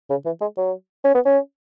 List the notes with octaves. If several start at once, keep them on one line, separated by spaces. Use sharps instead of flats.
C#3
E3
G#3
F#3
C#4
B3
C#4